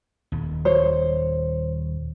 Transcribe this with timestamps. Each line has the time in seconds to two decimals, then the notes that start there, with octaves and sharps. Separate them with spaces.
0.32 D#1 D#2
0.65 C5 C#5